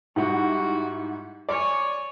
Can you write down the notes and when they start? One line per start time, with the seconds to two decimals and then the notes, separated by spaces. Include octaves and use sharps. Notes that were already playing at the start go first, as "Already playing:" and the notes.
0.16 G#2 G3 E4 F#4 F#5
1.49 C#5 D5 G#5